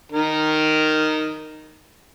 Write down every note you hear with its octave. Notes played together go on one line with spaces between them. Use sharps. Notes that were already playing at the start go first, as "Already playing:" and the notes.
D#3 A#4